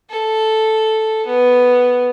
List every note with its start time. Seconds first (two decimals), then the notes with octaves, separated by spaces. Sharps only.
0.10 A4
1.26 B3